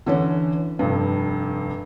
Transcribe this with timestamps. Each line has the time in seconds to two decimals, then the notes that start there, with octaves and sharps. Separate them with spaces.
0.06 D3 E3 C#4
0.79 F1 G2